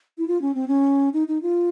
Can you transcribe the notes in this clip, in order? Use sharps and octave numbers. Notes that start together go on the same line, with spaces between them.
E4
F4
C#4
C4
C#4
D#4
D#4
F4